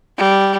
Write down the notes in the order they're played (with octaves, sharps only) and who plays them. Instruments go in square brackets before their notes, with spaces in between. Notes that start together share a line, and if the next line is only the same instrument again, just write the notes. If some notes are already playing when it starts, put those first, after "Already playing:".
[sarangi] G3